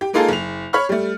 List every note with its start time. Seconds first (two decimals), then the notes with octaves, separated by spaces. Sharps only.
0.01 G4
0.13 G#3 A#3 D#4 F4 G#4 A4
0.29 F#1 F7
0.73 C#5 B5 C#6 F6
0.89 G3 A3